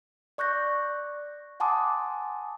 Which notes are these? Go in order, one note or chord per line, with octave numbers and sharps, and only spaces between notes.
D5 C#6 F#6 G6 A#6
F#5 G#5 A5 C6 D6 D#6